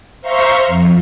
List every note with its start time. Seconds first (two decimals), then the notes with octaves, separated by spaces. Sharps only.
0.22 C5 E5 F5 A#5 C6 C#6
0.67 F2